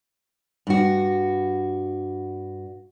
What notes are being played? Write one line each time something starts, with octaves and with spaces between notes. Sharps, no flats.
G2 F#4